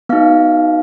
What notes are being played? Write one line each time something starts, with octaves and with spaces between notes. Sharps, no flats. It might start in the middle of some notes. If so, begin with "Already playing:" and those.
B3 D#4 F#4 F5